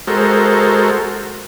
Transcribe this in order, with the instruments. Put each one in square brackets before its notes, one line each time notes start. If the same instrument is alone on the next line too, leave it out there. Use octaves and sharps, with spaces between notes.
[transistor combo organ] G#3 F#4 A4 A#4 C5